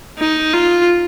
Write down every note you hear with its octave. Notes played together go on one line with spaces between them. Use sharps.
D#4
F4